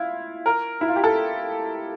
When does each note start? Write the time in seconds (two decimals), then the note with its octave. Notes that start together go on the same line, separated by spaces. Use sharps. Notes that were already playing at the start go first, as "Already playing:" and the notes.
Already playing: E4 F4
0.46 A#4
0.81 E4
0.88 F4
0.96 G4
1.04 A4